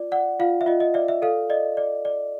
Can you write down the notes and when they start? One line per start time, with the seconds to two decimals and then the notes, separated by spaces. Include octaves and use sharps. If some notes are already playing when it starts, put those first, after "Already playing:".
Already playing: F4 D5
0.12 D5 F#5
0.40 F4 F5
0.61 E5
0.66 F4 D#5
0.80 D#5
0.94 D5 E5
1.08 E5
1.22 A4 F5
1.50 D5 D#5
1.77 D5
2.05 D5